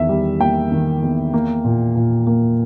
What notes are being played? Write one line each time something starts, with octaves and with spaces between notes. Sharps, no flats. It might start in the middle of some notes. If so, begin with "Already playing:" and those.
Already playing: E2 D#3 E5
G3
A#3 G5
D#3
E2
A#3
A#2
A#2
A#3